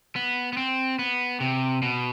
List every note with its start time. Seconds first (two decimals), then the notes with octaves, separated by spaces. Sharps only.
0.16 B3
0.53 B3
0.57 C4
0.99 B3
1.40 C3
1.82 B2